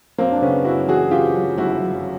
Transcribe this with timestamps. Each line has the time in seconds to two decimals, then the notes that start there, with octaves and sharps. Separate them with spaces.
0.18 F#2 A#3 C4
0.32 D4
0.42 C#3 B3 C#4
0.65 F#2 E4 F#4
0.88 E3 F#4 G#4
1.11 C#3 F4 G4
1.35 F#2
1.58 G1 E4 F#4
1.82 F#2